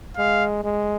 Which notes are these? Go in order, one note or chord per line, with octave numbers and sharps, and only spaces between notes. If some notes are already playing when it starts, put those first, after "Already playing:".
G#3 F5
G#3